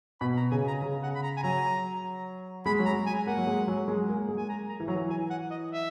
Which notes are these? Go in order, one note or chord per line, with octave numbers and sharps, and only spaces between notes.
B2 B5
A#5
C#3 G#5
A#5
C#3
F#5
B5
A#5
G#5
F#3 A#5
G#3 B5
F#3
A#5
G#3
G#5
A#3 F#5
F#3
G#3
F#3
G#3
A#3
G#3
G#5
A#5
A#5
E3
F#3 A#5
E3
G#5
F#5
D#5
E5